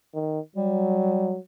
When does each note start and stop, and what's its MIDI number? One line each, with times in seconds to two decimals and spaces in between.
0.14 0.40 51
0.56 1.38 54
0.56 1.36 55